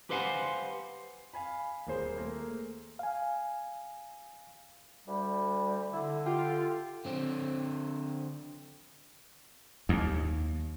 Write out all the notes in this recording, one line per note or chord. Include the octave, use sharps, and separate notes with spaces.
G4 B4 C5 F5 F#5 G#5
F5 G#5 B5
D#1 A#3 G#4 C5
A3 A#3
F5 G#5
D2 G3
D3 E4
F4 G4
D3 C4
D#2